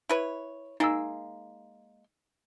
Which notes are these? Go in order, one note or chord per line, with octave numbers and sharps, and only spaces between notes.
E4 B4 C#5
G#3 A#3 D#4 E6